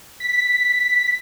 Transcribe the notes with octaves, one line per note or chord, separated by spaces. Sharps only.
B6